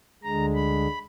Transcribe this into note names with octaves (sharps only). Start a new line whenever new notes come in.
D2 D3 G#3 A#5
B5